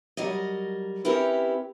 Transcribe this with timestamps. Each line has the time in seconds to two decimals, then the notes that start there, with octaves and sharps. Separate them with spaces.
0.17 F#3 G3 A#4 D#5
1.05 C4 C#4 E4 G4 A#4 B4